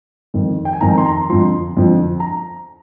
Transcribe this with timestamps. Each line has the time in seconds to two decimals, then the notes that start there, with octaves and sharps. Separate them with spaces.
0.34 F2 D#3
0.65 G5
0.73 G#5
0.81 F2 D#3 A#5
0.98 C6
1.06 A#5
1.29 F2 D3 F3 C6
1.77 F2 D3 F3
2.20 A#5